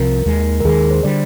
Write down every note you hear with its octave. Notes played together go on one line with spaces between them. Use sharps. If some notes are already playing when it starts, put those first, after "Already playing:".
Already playing: C2 C3 F3 A#4
D#2 D#3 G#3
A#4
D#2 D#3 G#3 G#4
C5
D3 G3 D5